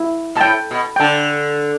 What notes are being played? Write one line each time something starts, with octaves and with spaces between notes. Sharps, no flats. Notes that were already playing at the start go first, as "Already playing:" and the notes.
Already playing: E4
B2 A5
A2 G5
B2
G5
D3 A5